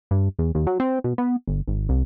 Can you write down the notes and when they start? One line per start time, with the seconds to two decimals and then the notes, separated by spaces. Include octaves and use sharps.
0.11 G2
0.39 E2
0.55 D#2
0.67 F#3
0.80 C4
1.04 B2
1.18 B3
1.48 G1
1.68 G#1
1.89 C2